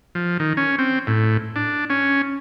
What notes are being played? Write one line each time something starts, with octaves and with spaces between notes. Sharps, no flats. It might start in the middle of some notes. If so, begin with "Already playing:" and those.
F3
D#3
C#4
C4
A2
D4
C#4